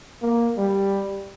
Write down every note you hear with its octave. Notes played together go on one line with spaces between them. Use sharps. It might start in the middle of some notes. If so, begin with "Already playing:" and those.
A#3
G3